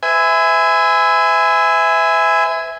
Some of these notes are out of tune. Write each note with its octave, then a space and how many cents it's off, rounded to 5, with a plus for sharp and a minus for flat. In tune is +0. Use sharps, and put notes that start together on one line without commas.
B4 +40 E5 -10 G#5 +0